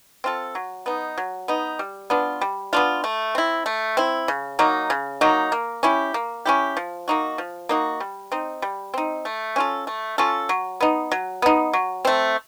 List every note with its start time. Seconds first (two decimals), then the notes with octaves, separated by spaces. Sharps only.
0.24 C4 F4 A4
0.55 F#3
0.86 B3 D#4
1.18 F#3
1.48 B3 D#4
1.79 G3
2.10 B3 D4 F4
2.41 G3
2.73 B3 D4 F4
3.04 A3
3.35 C4 E4
3.66 A3
3.97 C4 E4
4.28 C#3
4.59 F#3 A#3 D#4
4.90 C#3
5.21 F#3 A#3 D#4
5.52 A#3
5.83 C#4 E4 G4
6.14 A#3
6.46 C#4 E4 G4
6.77 F3
7.08 A#3 D#4 F#4
7.38 F3
7.69 A#3 D#4 F#4
8.00 G3
8.32 C4 D#4
8.62 G3
8.94 C4 D#4
9.25 A3
9.56 C#4 F4 A4
9.87 A3
10.18 C#4 F4 A4
10.49 F#3
10.81 B3 D#4
11.12 F#3
11.42 B3 D#4
11.73 F#3
12.05 A3 C4